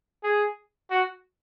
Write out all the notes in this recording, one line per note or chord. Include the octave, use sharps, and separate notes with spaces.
G#4
F#4